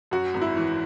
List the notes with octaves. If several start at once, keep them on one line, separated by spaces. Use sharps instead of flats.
F#2 F#4
G#1
E4
E3